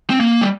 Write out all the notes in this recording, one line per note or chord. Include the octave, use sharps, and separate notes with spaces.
C4
A#3
G3